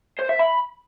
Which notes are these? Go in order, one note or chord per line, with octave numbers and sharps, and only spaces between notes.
C5
E5
B5